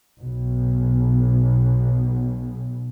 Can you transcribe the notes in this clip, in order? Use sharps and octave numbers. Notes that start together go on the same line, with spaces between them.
B1 B2